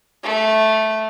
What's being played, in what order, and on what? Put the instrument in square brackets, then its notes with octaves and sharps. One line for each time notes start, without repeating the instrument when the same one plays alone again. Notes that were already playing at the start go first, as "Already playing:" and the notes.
[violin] A3